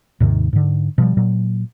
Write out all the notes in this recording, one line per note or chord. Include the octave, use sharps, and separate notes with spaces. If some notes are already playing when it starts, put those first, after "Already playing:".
D#2 G#2 C3 D#3
G#2 D3
B2 F3 G3
A#2 F#3